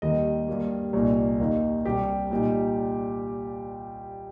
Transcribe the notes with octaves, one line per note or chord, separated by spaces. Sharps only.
D#2 D#3 G3 D#4 D#5
G2 G3 A#3
C2 A#2 A#3 D#4
D#2 D#3 A#3 D#4
C2 C3 G3 G4
A#2 G3 D#4